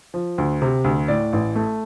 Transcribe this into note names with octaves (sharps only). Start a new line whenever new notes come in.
F3
D2
C3
D2
A2 D5
A1
A3